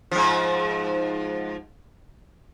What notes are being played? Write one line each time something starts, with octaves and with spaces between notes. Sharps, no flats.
G#2 F3